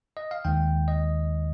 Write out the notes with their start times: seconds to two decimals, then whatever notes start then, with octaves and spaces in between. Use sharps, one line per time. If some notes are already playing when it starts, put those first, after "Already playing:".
0.17 D#5
0.31 F5
0.45 D#2 D#3 G#3 G5
0.88 D#5